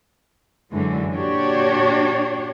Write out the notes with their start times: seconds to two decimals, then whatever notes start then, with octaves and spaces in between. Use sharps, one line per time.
0.72 F#2 D3 E3 F#3 G#3
1.14 A#2 D4 F#4 G4 C#5